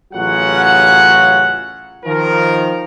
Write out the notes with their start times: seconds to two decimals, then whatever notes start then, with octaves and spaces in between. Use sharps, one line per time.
0.13 A1 C#3 F#3 F4 F#5
2.05 D#3 F3 A#4